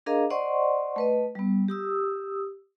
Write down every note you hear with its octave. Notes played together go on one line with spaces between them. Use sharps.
D4 G#4 A#4 D#5 F5 A#5
C5 D5 D#5 F#5 C6 C#6
A3 B4 D#5
G3 B3
G4 D#6 E6